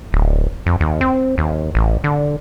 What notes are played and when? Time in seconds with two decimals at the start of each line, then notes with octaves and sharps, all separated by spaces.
0.13 D1
0.66 F2
0.80 D#2
1.01 C4
1.38 D#2
1.75 A1
2.04 D3